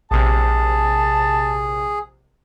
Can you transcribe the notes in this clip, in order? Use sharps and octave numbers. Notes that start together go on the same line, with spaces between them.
A#1 C3 G#4 A5